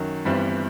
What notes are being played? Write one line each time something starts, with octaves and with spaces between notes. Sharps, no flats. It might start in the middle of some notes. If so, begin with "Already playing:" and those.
Already playing: F#2 D#3 F#3
G1 G2 E3 G3 C4